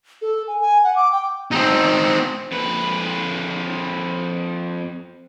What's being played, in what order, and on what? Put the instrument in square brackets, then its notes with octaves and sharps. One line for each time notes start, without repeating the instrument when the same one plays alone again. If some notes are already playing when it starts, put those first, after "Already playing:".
[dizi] A4
G#5
G#5
F#5
D6
G5
[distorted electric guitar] C4 D#4
[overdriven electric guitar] F2 B4